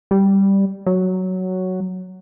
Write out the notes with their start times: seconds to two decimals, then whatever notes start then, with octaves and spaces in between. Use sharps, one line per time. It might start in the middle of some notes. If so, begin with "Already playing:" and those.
0.11 G3
0.87 F#3